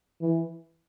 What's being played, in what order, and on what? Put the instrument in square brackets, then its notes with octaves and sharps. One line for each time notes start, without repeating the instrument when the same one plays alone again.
[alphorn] E3